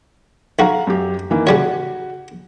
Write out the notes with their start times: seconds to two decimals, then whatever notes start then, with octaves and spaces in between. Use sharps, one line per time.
0.59 B1 F#4 F5 A#5
0.87 F#2 G4
1.30 D#3 E3 A#3
1.47 C#3 G3 F#4 C#5